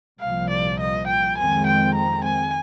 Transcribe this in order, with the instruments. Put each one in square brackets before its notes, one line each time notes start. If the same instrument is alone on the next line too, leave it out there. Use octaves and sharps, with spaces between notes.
[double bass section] C2 A#2 F3 [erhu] F5
[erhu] D5
D#5
G5
[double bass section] F2 D#3 G#3 C4 [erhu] G#5
[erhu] G5
A#5
G#5